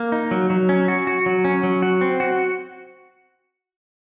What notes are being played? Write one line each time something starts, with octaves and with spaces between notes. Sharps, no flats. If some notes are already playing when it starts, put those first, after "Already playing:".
Already playing: A#3
D#4
F#3
F#3
C#4
F#4
F#4
F#3
C#4
F#3
F#4
C4
F#4